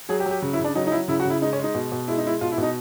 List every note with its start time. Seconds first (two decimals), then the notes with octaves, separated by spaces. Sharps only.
0.09 F#3 G#4
0.20 G4
0.26 F#3
0.31 G4
0.42 C#3
0.53 E4
0.59 C#3
0.64 D4
0.75 F#3 D#4
0.87 D#4
0.92 F#3 E4
1.08 C#3 E4
1.20 F#4
1.25 C#3 E4
1.41 G#3 D#4
1.53 C#4
1.59 G#3 D#4
1.75 B2
1.92 B2
2.08 G#3 E4
2.17 D#4
2.24 G#3 E4
2.41 B2 F4
2.52 E4
2.58 B2 D#4